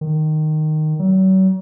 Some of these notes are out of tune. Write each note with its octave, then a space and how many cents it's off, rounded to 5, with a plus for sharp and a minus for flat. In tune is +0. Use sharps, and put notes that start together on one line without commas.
D#3 -10
F#3 +40